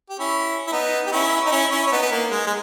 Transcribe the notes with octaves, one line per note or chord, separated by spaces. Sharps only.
G4
C#4 E4
E4
B3 D#4
G4
C#4 E4
D#4
C#4 E4
C#4 E4
C#4
B3 D#4
B3
A#3
G#3
G#3